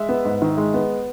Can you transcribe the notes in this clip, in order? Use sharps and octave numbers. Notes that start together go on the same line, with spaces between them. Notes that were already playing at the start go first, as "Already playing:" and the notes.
Already playing: G#3 E5
B3
G#2
D#3
G#3
B3